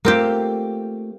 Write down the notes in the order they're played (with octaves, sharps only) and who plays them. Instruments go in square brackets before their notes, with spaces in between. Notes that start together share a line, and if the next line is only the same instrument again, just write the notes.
[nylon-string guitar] A3 F4 [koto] A#3 C4 G4